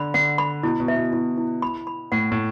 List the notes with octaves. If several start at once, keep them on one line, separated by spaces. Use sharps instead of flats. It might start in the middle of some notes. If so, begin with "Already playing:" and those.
Already playing: D3 B5
D3 F#5
B5
B2 E4
B2
E5
B2
B2 E4
E4
B5
B5
A2 F#5
A2